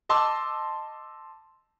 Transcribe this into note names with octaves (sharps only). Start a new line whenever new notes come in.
D#5 A5 C6 D6 E6